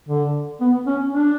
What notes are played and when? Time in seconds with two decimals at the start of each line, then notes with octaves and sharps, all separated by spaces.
0.08 D3
0.61 B3
0.87 C#4
1.12 D4